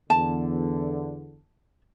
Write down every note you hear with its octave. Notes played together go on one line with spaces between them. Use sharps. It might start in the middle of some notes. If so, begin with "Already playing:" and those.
E2 D3 A5